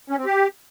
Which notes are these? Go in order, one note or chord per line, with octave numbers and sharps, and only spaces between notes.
C#4
C4
G4